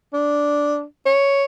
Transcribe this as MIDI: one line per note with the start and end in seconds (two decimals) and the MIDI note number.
0.13 0.83 62
1.06 1.45 73